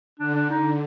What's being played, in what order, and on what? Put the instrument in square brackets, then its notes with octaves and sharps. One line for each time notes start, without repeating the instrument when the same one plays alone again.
[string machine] D3 [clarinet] D4
[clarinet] D4
[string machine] D3 [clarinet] D#4